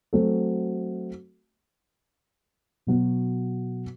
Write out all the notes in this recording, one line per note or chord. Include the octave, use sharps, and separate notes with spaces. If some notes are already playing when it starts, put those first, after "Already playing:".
F#3 A3 C4 F#4 A4
B2 F#3 B3 F#4